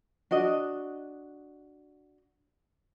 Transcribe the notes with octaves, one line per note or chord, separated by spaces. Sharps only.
D4 F#4 D#5